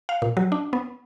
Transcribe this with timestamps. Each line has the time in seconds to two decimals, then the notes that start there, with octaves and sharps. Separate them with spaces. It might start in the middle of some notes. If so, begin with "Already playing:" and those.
0.09 F5
0.22 A#2
0.37 F#3
0.52 D4
0.73 B3